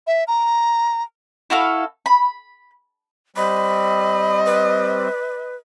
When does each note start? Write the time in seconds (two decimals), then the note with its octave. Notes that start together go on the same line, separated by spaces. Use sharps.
0.07 E5
0.28 A#5
1.50 E4 F#4 A4 F5
2.06 B5
3.36 G3 C4 D#5 B5
4.46 B4